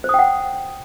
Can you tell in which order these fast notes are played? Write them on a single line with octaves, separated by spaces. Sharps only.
C5 D#6 G5 F#5